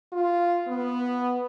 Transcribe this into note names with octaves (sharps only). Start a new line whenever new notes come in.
F4
B3